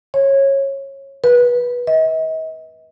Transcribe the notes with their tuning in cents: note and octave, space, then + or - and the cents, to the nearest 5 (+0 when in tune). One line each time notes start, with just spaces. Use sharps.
C#5 -20
B4 -20
D#5 +40